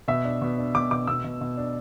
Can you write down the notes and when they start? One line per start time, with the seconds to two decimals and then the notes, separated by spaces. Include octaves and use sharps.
0.08 B2 E5
0.25 D4
0.41 B2
0.58 D4
0.75 B2 D6
0.91 B2 D6
1.07 B2 E6
1.24 B2
1.41 B2
1.57 D4